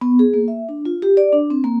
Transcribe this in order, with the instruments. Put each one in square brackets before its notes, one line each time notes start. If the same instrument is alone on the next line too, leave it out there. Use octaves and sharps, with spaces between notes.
[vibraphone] B3
G#4
A#3
E5
D4
F4
G4
D5
D4
C4
A#3